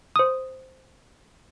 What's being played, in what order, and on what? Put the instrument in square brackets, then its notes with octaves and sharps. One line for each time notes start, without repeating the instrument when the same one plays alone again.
[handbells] C5 D#6